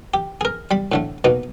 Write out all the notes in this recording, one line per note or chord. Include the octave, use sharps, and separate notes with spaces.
G4
G#4 A#4
G3 B5
A2 D3 A3
B2 A#3 D#4